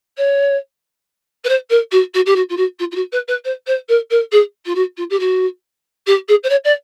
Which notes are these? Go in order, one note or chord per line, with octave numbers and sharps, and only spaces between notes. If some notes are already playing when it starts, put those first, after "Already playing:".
C#5
B4
C5
A#4
F#4
F#4
G4
F#4
F4
F#4
F4
F4
F#4
B4
B4
C5
C5
A#4
A#4
G#4
F4
F#4
F4
G4
F#4
G4
G#4
C5
C#5
D5